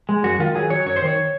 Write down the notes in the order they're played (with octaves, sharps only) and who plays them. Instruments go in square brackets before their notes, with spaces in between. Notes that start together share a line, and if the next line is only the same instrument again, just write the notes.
[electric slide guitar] G#3
F#2 F#4
D#3 F4
F#3 G#4
F#3 C#5
F#2 C#5
C5
D#3 C#5